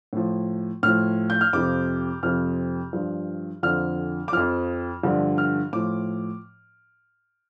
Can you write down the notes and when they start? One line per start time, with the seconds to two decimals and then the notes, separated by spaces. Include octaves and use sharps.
0.13 A2 F3
0.83 A2 F3 F6
1.30 G6
1.41 F6
1.53 F2 C3 F3 D6
2.23 F2 C3 F3 F6
2.93 G2 F3
3.63 F2 D3 F3 F6
4.28 D6
4.32 F2 F3 F6
5.03 G2 D3 F3
5.38 F6
5.73 A2 F3 D6